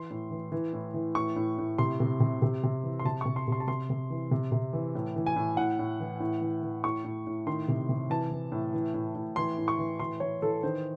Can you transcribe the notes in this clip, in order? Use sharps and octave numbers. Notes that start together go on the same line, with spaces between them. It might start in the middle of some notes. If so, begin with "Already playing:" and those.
Already playing: E3 C6
A2
E3
E3
A2
E3
A2 C#6
A2
A2
C3 C6
C3
C3
C3
C3
E3
C6
C3 A5
C3 C#6
C6
C3 C6
A5
C3 C6
C3
E3
C3
C3
E3
A2
E3
G#5
A2
A2 F#5
A2
E3
A2
E3
E3
A2 C#6
A2
A2
D#3 C6
C3
C3
E3 A5
E3
A2
E3
A2
A2
E3 C6
A2
C#6
E3
E3 C6
E3 C#5
E3 A4
D#3 C5